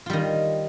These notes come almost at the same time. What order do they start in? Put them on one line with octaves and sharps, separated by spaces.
F4 G3 D#3